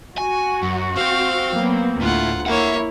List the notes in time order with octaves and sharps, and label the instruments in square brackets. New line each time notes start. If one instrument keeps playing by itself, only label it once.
[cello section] F#4 [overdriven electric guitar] G#5
[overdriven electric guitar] F#2
[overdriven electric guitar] C4 C5 [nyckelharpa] F5
[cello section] F#3 A#3 B3
[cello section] D2 [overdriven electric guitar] A2 [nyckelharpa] F4 F#5
[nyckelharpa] A#3 C#5 [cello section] E4 [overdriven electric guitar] E5 F#5